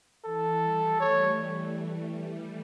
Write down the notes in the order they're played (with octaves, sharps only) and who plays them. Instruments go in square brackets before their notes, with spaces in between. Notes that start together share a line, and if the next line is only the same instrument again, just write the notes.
[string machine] E3 [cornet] A4
[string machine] G3
[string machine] A3 [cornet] C#5